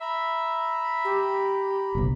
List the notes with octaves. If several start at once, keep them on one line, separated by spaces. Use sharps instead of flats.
E5 A#5 B5
G4
F#1 B1